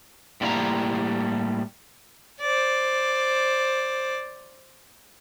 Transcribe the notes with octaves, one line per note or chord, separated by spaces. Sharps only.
A2 G3 A#3 E4 G4 A#5
C5 D5